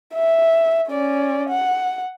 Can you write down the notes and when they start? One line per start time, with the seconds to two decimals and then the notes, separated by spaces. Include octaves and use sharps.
0.15 E5
0.89 C#4 D5
1.49 F#5